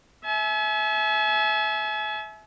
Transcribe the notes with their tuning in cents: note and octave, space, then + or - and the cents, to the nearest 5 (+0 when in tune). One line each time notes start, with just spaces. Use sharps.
E5 -15 G#5 +40